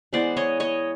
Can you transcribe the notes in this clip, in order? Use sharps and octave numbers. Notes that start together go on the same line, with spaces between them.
E3 G#3 B3 C5 D5
C#5 D#5
C#5 D#5